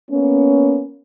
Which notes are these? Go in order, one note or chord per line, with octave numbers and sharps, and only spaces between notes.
A#3 B3 C#4